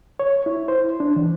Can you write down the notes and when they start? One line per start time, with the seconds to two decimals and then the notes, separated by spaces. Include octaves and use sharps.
0.20 C#5
0.46 E4
0.68 C5
1.00 D4
1.16 E3